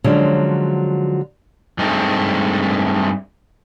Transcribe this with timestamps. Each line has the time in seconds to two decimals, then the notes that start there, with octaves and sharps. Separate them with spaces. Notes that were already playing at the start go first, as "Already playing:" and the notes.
0.04 D3 F3 F#3 G#3 C#4
1.78 G2 G#3 A3 C4 D#4